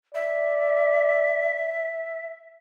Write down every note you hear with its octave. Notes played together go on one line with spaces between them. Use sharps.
D5 E5